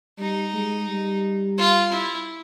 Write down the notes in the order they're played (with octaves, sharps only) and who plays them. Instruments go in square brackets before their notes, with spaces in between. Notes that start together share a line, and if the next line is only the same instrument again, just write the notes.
[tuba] G3 [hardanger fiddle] D#4
[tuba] G#3
G3
[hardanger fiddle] F4
E4